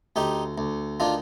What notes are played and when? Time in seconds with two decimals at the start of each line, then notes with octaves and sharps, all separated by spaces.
0.16 D2 D#4 G4
0.58 D2
1.00 D#3 D4 F4